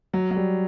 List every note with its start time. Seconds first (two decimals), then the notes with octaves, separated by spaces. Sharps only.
0.13 F#3
0.31 F#3
0.37 G3